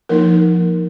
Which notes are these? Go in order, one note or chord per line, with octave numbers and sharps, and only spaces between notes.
F3 A#3 D#4 A#4